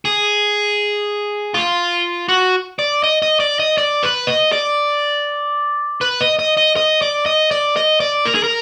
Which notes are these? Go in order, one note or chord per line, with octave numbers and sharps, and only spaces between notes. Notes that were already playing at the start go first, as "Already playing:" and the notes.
G#4
F4
F#4
D5
D#5
D#5
D5
D#5
D5
B4
D#5
D5
B4
D#5
D#5
D#5
D#5
D5
D#5
D5
D#5
D5
A#4
G#4
A#4